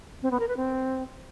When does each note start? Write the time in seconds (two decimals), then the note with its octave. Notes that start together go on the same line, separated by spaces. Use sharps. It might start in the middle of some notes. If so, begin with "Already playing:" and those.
0.22 C4
0.31 B3
0.40 A#4
0.48 B4
0.57 C4